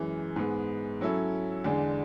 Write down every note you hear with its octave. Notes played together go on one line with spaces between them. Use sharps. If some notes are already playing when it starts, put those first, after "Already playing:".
Already playing: F#2 E3 G#3
G#2 G#3 B3
F#3 C#4 E4 A4
E2 D3 G#3 D4